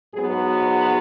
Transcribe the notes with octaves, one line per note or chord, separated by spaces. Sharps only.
G#2 F#3 B3 G#4
F#4